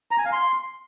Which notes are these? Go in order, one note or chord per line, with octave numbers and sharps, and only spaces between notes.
A#5
G#5
F5
C6